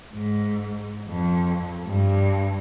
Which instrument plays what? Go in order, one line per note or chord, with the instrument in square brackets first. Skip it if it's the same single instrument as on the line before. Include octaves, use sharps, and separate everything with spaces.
[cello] G#2
F2
G2